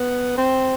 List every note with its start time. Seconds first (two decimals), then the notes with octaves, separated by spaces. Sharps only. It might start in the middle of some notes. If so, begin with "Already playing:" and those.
Already playing: B3
0.38 C4